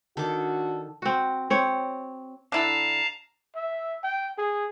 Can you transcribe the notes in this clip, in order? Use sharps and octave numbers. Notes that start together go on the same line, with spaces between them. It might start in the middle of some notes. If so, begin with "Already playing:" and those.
D#3 D4 F#4 A4 D6
C4 F#4
C4 C#5
D3 E4 A4 F5 A5 A#5
E5
G5
G#4